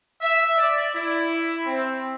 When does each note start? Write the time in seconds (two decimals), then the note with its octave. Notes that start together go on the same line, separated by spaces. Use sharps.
0.20 E5
0.57 D5
0.94 E4
1.66 C4